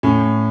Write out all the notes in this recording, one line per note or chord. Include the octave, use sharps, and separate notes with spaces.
A2 C#4